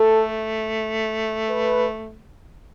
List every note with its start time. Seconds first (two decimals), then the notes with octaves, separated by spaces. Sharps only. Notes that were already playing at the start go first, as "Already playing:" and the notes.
Already playing: A3 A4
1.49 B4